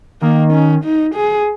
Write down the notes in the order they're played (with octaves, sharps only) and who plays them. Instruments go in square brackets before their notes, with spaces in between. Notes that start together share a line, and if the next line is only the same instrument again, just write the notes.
[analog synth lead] D#3 [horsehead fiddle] A#3
[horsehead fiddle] C#4
D#4
G#4